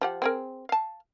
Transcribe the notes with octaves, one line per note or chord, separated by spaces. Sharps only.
F3 G4 F#5
C4 G#4 A#4
F5 A5